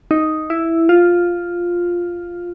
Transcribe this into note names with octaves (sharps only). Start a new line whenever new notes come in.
D#4
E4
F4